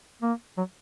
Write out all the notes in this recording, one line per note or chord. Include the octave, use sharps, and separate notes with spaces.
A#3
F#3